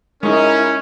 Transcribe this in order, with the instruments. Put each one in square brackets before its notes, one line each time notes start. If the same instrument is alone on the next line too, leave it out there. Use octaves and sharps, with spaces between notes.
[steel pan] G#3 D#4 [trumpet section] C#4 [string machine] E4 [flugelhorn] A#4